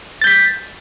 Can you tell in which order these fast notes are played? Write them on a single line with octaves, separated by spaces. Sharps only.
A6 G6 B6